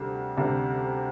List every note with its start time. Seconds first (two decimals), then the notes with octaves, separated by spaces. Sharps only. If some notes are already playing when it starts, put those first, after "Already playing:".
Already playing: D2 C3 G3 D4
0.37 D2 C3 G3 D4